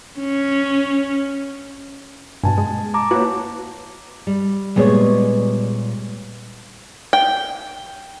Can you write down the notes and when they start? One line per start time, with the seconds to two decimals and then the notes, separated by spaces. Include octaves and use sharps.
0.20 C#4
2.43 G2 B2 G#5 A5
2.58 G#3
2.94 A5 A#5 D6
3.11 A#3 E4 F#4 B4 C#5
4.27 G3
4.76 A#2 G3 G#3 B3 G#4 C#5
7.13 G5